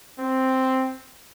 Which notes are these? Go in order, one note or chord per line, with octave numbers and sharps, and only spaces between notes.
C4